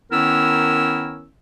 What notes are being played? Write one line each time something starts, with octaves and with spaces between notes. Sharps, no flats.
D#3 B3 C#4 E4 A#4 E6